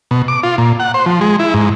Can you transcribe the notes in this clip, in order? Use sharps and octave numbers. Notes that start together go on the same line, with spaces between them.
B2
D6
F4
A#2
F#5
C5
F3
G#3
E4
G#2